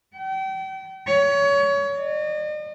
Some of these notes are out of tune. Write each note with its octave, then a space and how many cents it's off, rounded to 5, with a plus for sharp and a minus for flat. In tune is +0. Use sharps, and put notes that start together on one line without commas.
G5 -35
C#5 +25
D#5 -45